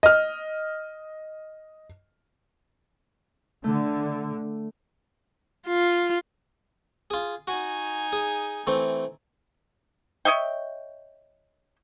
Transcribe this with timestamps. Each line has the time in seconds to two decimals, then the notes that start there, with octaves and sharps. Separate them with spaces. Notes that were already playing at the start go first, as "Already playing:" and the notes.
0.03 D#5 F6
3.64 D3 A3
5.67 F4
7.10 F4 G#4
7.47 D#4 F#4 G#5
8.13 G#4
8.67 E3 A3 C4
10.25 C#5 D#5 E5 G5